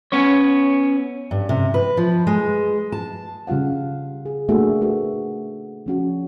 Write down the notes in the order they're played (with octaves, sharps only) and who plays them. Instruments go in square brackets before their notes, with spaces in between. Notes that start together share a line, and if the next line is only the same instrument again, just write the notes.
[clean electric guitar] B3 C#4 C#5
[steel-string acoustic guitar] G2
C3
B4
F3
G#3
A5
[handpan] C#3 G3 F4 F5 F#5
G#4
A3 A#3 D4 F#4 G#4 E5
A3 F#4 B4
F3 C#4 F#4